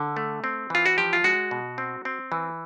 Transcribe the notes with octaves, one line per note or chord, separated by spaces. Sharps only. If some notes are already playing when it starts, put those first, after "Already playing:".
Already playing: D3
A3
C4
E3 F4
F#4
F3 G4
F4
G#3 F#4
B2
C4
C4
E3